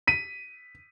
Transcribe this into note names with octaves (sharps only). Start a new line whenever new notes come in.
B6 D#7